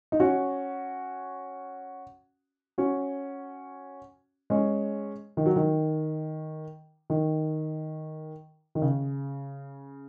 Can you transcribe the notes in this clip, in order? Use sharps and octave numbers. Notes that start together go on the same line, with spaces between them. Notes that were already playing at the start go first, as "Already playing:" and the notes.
D#4
C#4 F#4
C#4 F#4
G#3 C#4
D#3
F#3
D#3
D#3
D#3
C#3